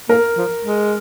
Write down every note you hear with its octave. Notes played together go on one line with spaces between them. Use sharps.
A#3 A#4
F3
G#3